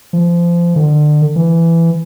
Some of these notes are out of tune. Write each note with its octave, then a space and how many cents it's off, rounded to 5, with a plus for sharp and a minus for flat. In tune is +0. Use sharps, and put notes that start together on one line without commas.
F3 -25
D3 +30
E3 +15